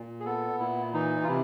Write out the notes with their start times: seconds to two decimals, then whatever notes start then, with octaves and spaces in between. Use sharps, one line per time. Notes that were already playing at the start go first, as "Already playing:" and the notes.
Already playing: A#2
0.20 G#4
0.25 B3 A4
0.59 A#2 E4
0.94 E3 D#4
1.23 F4
1.27 C3 E4